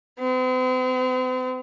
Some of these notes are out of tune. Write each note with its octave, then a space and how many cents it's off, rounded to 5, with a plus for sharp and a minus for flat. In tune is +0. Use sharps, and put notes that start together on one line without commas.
C4 -45